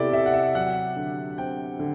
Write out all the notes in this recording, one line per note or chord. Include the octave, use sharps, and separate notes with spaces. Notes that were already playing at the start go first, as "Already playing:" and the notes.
Already playing: C3 B3 E4 G4 A4 D5
C3 E5
F#5
E5
F#3 F#5
D3
C4 G5
D3